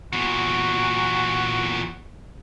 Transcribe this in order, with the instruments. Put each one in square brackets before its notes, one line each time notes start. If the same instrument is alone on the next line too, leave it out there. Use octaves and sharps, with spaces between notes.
[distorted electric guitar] E2 A#2 [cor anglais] F#4